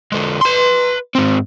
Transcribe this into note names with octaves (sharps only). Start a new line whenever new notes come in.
D3 G#3
B4 C6
G#2 C4